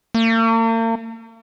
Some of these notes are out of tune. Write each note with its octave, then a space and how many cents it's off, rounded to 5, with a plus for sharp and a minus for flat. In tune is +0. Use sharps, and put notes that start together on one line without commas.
A#3 -45